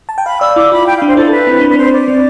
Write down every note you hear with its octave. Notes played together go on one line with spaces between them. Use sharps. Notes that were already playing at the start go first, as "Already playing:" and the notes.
A5
G5
F5 B5
D5 E6
E4 D6
F4 B5
G5
F5
D4
C5
E4 A4
B4
C4
D4
B4
C4 C5
D5
C4